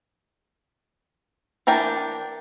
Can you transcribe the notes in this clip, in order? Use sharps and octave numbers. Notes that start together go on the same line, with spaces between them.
E3 D4 A#4 G5